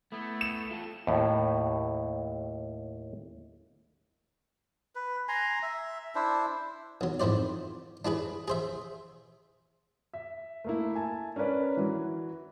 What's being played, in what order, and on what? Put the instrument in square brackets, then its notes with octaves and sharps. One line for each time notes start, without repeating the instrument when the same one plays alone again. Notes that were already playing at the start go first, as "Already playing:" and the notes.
[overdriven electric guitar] A3 [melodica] B3 E4
[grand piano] E7
[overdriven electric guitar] F4 A4
[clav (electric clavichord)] D#2 A2
[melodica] B4
G#5 A#5 C6
E5
D4 E4 C5
[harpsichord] B1 F#3
F2 G#2 E4 C5 D5
D4 E4 G#4 B4
G#4 C5 E5
[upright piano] E5
A3 A#3 E4
G#5 A5
C#4 D4 A#4 B4 D5
E3 F#3